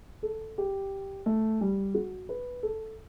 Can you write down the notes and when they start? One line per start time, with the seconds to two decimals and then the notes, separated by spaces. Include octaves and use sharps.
0.23 A4
0.58 G4
1.26 A3
1.61 G3
1.94 F#4
2.29 B4
2.63 A4